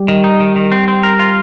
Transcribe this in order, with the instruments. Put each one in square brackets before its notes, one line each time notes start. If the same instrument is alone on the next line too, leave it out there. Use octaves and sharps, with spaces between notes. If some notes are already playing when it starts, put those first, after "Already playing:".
Already playing: [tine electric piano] G3 G4
[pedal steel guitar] D#3
D#4
D#3
D#3
C4
C4
A#4
F4